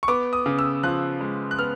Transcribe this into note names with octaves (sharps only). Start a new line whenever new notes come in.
C#6
B3 D6
D#6
C#3
E6
F3 F#6
G#3
F#6
B3 F6